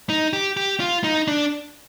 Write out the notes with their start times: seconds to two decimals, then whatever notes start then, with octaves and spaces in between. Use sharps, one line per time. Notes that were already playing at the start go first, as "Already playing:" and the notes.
0.10 D#4
0.33 G4
0.57 G4
0.80 F4
1.04 D#4
1.28 D4